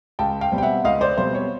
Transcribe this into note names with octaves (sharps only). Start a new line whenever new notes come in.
C#2 G5 A5
F5 G5
B2 G3 C4
G5
E5 F#5
C#2 D#5 F5
C5 D5
B2 G3 C4 C5
C#5